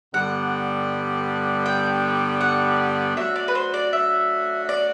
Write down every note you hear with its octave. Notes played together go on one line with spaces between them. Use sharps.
G2 D3 G3 B3 F#5
G5
F#5
F#3 A3 D4 F#4 E5
D5
B4
C5
D5
E5
D5